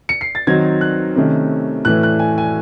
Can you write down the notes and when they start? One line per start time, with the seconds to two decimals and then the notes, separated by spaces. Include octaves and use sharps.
0.09 C#7
0.21 C7
0.35 A6
0.47 D#3 F#3 C4 D#4 G#6
0.81 F#6
1.16 C3 D#3 A3 C#4
1.85 A2 E3 A3 F#6
2.03 F#6
2.19 G#5
2.38 G#5